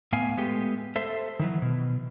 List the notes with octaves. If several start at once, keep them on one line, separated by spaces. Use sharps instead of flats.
A2 B3 E5 F5 G#5
G#3 A3 B3 G4
A4 C5 E5
D#3 E3 F#3
B2